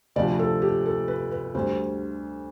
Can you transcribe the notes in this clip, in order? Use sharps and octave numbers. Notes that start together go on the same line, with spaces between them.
D2 C3 F3 D5
A4
G4
A4
B4
B4
D2 D3 G3 C5